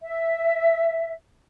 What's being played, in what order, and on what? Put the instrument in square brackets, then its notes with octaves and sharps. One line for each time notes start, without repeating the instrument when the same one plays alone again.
[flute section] E5